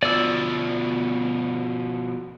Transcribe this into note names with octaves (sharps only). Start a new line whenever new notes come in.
B2 F3 D5 E6